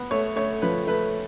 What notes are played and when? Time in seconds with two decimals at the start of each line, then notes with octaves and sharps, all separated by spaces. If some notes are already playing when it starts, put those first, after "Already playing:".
Already playing: B3
0.11 A3 C#5
0.36 A3 C#5
0.62 F3 B4
0.87 A3 B4